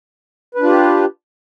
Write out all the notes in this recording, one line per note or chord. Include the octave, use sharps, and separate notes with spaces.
D4 F4 G4 B4